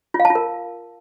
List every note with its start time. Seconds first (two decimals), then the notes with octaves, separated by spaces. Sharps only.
0.14 F4
0.20 F5
0.25 A5
0.30 F4
0.35 A#4